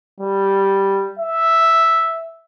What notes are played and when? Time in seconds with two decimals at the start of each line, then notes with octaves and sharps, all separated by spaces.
0.20 G3
1.19 E5